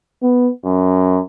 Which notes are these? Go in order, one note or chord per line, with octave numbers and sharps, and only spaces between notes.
B3
F#2